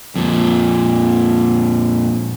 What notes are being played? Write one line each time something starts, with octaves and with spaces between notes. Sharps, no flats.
F2 A#2